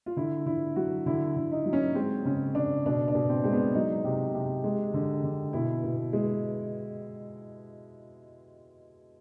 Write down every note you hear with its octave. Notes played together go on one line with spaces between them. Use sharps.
F4
D3 E4
D3 E4
F#3 F#4
D3 E4
D3
D#4
F#3
C#4
G#3 C4
C#3 C#4
C#3 D4
B2 D4
D4
B2
C4
G#3 C4
B3
F#3 D#4
C3
C3
G#3
D3
D3
B2 E4
B2
G#3